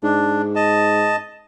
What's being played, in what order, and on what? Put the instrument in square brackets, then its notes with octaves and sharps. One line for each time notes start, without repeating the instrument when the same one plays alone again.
[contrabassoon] G#2 [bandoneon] D4
[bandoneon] D#5 A5